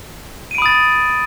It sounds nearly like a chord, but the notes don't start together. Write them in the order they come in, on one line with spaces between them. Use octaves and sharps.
D#7 D7 B5 D#6 A6